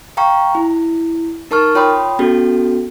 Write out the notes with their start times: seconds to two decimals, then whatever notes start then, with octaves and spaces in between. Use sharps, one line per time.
0.17 F5 G5 A#5 C#6
0.55 E4
1.51 D#4 A#4 A5 C#6 F6
1.75 F4 C#5 G5 B5 C6 D#6
2.19 B3 C#4 F#4 G4 A4